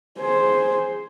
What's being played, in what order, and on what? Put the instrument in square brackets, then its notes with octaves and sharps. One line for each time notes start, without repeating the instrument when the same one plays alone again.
[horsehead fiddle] G#4 C5